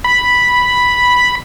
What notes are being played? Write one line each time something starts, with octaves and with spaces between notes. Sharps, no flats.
B5